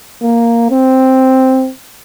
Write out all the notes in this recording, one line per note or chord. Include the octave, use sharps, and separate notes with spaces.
A#3
C4